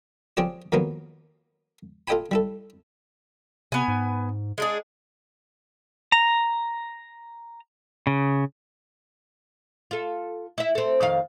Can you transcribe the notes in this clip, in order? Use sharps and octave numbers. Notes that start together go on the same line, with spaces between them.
F3 C4 G4 G#4 C#5 D5
F2 D#3 F#3 A#3 B3
F4 A4 D#5 G5 G#5 B5
G3 E4 A4
C3 B3 G#5
G#2
G#3 D4 G#4
A#5
C#3
F4 A4
E4 E5
C4 A4
F2 D#3 F5